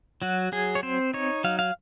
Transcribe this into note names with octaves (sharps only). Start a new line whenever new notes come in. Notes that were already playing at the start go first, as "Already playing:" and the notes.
F#3 F#4
F#3 G#4
C#5
C4 C5
D#4 C#5
F#3 F5
F5